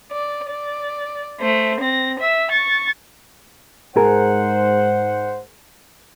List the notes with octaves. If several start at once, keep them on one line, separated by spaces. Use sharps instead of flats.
D5
D5
A3 C5
C4 A#6
E5 E6
C#6 A6
G#2 G#4 A#4 C5 F#5